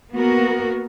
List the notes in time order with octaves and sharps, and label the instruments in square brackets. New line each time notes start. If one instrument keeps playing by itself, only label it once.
[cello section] A#3 B3 F#4 A#4